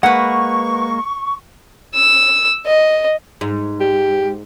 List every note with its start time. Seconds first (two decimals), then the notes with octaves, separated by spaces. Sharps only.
0.03 G#3 A#3 B4 F#5 C#6
1.95 E6
2.66 D#5
3.41 G#2
3.81 G4